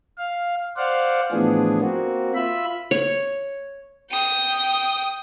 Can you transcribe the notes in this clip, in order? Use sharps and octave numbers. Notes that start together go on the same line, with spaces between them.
F5
C5 D5 F5 F#5
A2 E3 F3 B3 D4 G#4
A#3 C4 F#4
F4 E5 B5
C#5
G5 D#6